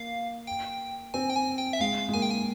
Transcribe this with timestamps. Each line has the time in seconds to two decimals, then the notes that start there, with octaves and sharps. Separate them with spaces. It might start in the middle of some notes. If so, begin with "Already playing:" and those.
Already playing: A#3 F5
0.47 G5
1.14 C4 G#5
1.30 G5
1.36 G#5
1.58 G5
1.73 E5
1.80 G#3 F5
2.08 G#3
2.14 A#3 G#5
2.22 G5
2.31 G#5